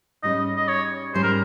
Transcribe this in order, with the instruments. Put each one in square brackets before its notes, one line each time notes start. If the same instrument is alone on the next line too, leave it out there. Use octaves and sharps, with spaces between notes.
[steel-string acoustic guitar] G#2 G3 C#4 [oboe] D#5
[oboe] D#5
C#5
[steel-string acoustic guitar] G#2 G3 C#4 [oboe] C5
[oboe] A#4